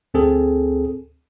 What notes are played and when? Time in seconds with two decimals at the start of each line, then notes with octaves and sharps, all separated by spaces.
0.14 D2 C4 G#4 A4